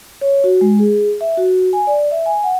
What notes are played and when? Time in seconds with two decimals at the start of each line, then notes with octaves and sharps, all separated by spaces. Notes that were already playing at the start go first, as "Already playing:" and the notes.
0.21 C#5
0.44 F#4
0.61 G#3
0.79 G#4
1.21 E5
1.37 F#4
1.73 G#5
1.87 D5
2.11 E5
2.26 G#5
2.43 F#5